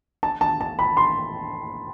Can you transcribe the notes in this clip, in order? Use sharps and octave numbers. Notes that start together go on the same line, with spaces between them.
A5
A5
A5
B5
C6